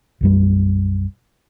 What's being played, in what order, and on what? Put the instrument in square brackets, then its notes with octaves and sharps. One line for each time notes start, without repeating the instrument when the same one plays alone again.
[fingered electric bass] B1 F#2 G3